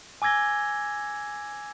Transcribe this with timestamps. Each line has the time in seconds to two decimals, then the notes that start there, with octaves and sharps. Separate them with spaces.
0.22 G#5 D6 E6 G#6 A#6 G7